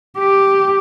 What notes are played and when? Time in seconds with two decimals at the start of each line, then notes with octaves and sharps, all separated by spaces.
0.19 G4